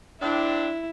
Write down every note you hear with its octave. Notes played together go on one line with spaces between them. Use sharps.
A2 C4 D4 E4